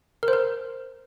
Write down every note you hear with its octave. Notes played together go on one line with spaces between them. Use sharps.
A#4
C5
A#4